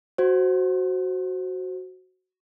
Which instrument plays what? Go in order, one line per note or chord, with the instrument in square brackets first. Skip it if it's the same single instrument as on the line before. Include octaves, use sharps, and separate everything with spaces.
[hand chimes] F#4 C5